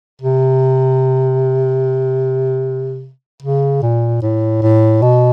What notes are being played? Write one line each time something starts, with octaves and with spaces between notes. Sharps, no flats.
C3
C#3
A#2
A2
A2
B2